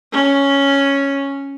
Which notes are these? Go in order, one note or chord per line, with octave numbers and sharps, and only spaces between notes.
C#4